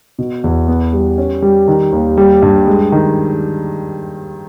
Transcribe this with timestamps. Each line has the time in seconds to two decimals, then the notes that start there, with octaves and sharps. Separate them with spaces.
0.19 B2
0.44 E2
0.68 B3
0.93 G3
1.18 C#4
1.42 G3
1.68 D#3
1.92 D#2
2.17 G3
2.42 G2
2.67 G#3
2.92 D#3